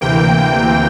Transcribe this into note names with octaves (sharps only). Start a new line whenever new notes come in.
D2 C3 E3 A#3 G5